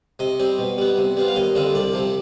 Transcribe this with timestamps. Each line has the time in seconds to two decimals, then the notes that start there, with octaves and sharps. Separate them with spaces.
0.19 C3 D#5
0.40 G3 C4
0.59 B2
0.78 G3 B3
0.98 C3
1.17 G3 B3 F4
1.28 F5
1.36 D#2 D#5
1.55 D3 G3 C4 F4
1.74 C2 D5
1.94 C3 F3